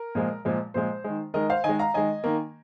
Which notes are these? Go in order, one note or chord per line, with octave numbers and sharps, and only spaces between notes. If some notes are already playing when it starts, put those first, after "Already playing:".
Already playing: A#4
A#2 F3 G#3
A#2 F3 G#3
A#2 F3 G#3 C5
D#3 G#3
D#3 G#3 A#4 D#5
C5 F5
D#3 G#3 D#5 G#5
F5 A#5
D#3 G#3 D#5 G#5
D#3 A#3